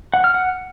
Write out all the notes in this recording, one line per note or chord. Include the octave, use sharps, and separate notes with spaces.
F#5
F6
F#5